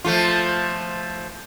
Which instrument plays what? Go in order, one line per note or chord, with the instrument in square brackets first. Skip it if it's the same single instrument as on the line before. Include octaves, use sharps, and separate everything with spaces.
[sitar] F3 A3 F4